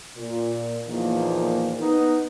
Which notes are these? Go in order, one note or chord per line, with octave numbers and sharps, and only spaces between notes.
A#2
E2 A#2 D#3 F3 A#3
B3 D#4